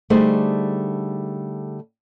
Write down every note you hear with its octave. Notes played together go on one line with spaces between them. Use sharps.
D3 G3 A3 D#4 G#4 C5